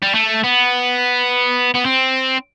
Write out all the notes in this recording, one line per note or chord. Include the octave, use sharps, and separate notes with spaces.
G3
A3
B3
B3
C4